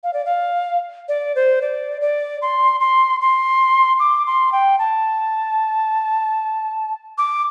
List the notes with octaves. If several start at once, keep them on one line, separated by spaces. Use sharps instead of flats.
F5
D5
F5
D5
C5
D5
D5
C6
C6
C6
D6
C6
G5
A5
D6